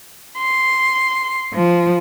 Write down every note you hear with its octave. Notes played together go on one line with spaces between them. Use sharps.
C6
F3